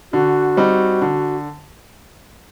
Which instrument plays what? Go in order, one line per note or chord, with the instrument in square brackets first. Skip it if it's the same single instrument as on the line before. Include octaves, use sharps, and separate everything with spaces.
[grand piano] D3 [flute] F#4
[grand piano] G3 C4 D#4
D3